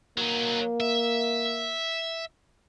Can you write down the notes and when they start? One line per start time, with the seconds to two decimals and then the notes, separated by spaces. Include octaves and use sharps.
0.18 F#3 A#3 D#4
0.80 E5